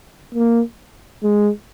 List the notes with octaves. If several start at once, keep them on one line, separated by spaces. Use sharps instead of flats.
A#3
G#3